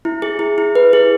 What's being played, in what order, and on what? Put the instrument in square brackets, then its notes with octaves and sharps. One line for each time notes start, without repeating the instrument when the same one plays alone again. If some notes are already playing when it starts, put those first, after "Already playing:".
[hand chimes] E4
G#4
E4
E4
B4
G#4